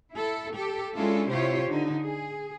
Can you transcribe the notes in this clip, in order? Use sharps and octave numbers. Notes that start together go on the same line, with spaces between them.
E4 A4
G4 A4
G#3 C#4 D4 E4 F4 A4
C3 E4 F4 G4 C5 C#5
D3 D#4
G#4